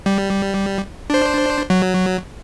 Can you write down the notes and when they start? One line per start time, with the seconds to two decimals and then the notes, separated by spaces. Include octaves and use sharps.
0.06 G3
1.10 D4 C5
1.70 F#3